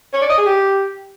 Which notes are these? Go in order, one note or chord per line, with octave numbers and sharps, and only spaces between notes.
C#5
D5
D#5
G#4
G4